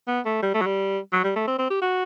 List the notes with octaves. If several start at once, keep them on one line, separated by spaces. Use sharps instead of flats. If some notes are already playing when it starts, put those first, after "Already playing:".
B3
A3
G3
A3
F#3
G3
F#3
G3
A3
C4
C4
G4
F#4